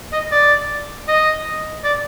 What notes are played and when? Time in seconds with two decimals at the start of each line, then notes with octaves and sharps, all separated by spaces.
0.12 D#5
0.32 D5
1.08 D#5
1.84 D5